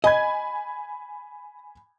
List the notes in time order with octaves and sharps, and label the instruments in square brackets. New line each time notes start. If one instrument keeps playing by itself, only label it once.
[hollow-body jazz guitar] D#5 [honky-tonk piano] G#5 B5 G#6